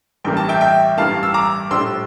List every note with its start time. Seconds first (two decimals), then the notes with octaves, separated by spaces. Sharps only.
0.24 A1 G2 E3 G3 A#3 G5
0.37 A5
0.49 E5 G5
0.61 E5 G5
0.97 A1 G2 E3 G3 A#3 F5 A5
1.23 E6
1.34 A#5 D6
1.71 A#1 A2 G3 D4 F4 C6 E6